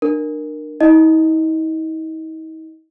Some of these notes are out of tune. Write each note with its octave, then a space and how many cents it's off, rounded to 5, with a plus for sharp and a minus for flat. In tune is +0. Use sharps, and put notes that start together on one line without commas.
D4 +35 A#4 +0
D#4 +45 D#5 +0